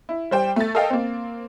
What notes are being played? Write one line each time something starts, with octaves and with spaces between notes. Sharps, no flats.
E4
G3 C5 G5
A3 A6
A4 A#4 D#5 F5 G5
A#3 C4